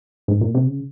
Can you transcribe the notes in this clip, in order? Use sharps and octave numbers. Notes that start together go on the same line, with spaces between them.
G#2
A#2
C3
C#3